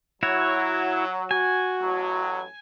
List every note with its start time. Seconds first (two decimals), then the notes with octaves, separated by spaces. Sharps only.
0.23 F#3 E4 F#4 C#5
1.31 F#4 G#5
1.82 A1 A2 F#3